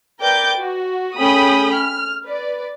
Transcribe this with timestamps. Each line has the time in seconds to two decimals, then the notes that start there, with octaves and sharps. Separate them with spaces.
0.20 A#4 B4 D5 G5 D6 G6
0.58 F#4
1.17 A3 C#4 G#4 G5 B5 D#6
1.73 F6
2.24 B4 D5